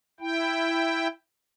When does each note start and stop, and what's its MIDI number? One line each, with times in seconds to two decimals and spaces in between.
0.20 1.07 64
0.20 1.07 79